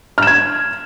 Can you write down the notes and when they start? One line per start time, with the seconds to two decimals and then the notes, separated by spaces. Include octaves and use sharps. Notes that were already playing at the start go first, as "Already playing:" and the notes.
0.18 F6
0.22 E7
0.27 G#6